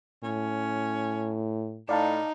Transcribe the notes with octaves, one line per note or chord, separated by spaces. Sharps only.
A2 C#4
A2 D#4 D5 F5 A5